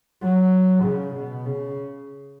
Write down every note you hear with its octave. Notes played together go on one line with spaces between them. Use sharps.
F#3
C#3
B2
C#3